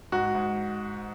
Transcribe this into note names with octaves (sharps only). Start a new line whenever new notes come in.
G#2 F#4
G#2